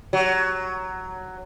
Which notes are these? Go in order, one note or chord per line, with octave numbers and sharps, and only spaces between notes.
F#3